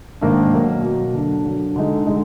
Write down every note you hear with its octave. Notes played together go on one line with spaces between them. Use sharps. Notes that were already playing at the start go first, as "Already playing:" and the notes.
G#2 D#3 A#3 D4
B2 F#3 A#3
B2 F#3 A#3
D3 F#3 D4
D3 F#3 D4
D3 G#3 D#4
D3 G#3 D#4